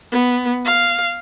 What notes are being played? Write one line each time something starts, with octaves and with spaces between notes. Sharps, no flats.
B3
F5